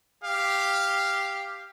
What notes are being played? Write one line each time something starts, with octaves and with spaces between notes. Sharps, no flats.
G4 F5